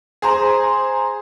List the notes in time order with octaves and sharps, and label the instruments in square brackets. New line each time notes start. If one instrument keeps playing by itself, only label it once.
[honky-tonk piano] G#4 C5 A#5